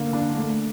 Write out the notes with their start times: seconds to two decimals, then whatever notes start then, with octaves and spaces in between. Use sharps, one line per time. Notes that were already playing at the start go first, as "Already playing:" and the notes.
Already playing: D3 A#3
0.13 D4
0.36 A3